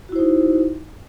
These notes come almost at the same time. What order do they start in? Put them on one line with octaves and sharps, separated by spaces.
F#4 E4 C5 D#4